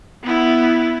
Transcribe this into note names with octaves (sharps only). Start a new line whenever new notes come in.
B3 E4